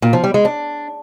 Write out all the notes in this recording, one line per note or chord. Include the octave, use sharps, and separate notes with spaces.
A#2
F3
G3
G#3
D4